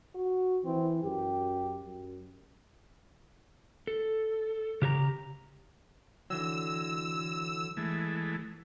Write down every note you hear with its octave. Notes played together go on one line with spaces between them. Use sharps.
F#4
E3 C4
F#2 G4
F#2
A4
C#3 G4 C#5 A#5
D3 E3 F#3 E6
E3 G#3 A3